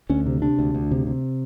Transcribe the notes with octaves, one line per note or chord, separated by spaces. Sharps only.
D2 C#4
C3
C3 D4
D2
D2
C3
C3